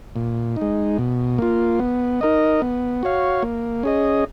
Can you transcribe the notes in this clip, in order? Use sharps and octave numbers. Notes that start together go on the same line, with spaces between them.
A#2
G#3 D#4
B2
A#3 F4
B3
D#4 A#4 D#5
B3
F#4 C#5 F5
A#3
C#4 G#4 D#5